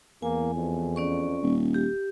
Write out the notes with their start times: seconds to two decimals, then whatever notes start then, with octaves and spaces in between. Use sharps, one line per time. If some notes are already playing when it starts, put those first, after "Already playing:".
0.22 E2 A#3 G#5
0.55 F2
0.96 C#4 D5 C#6
1.43 D#1
1.74 G4